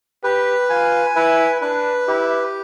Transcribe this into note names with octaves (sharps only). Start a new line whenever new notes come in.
G4 B4
F4 G#5
E4 B4
D4 B4
E4 G4